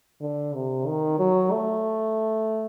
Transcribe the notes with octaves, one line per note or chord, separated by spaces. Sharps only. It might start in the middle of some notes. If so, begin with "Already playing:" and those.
D3
C3
D#3
F#3
A3